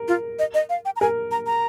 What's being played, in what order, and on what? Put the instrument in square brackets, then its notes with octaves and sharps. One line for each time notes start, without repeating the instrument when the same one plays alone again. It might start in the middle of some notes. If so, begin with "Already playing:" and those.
Already playing: [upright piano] A#4
[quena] F4
D#5
D#5
F5
G5
A#5
[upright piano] A#4 [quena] G#5
[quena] A#5
A#5